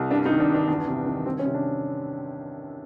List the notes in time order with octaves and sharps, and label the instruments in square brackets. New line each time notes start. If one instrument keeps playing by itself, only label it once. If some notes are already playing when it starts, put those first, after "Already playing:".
Already playing: [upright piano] C2
G2 D4
D#4
D#3
D4
G2
D4
E2 D4
C3
D#3
C2 C4
C#4
C3
D4